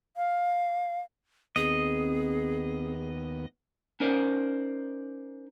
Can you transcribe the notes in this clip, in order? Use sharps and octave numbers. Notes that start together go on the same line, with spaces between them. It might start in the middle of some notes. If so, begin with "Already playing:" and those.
F5
D#2 B3 C4 G#4 D#5
C#4 D#4 A#4 C5 D5